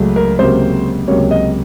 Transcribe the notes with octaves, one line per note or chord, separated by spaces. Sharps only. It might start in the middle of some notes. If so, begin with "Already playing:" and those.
Already playing: C#2 C#3 F#3 A3
A#4
C#2 C3 F#3 A#3 C5
C#2 C3 F#3 A#3 C#5
D#5